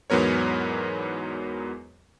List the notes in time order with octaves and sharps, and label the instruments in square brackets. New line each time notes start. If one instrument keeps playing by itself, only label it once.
[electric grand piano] E2 G#2 F#3 B3 A#4 C#5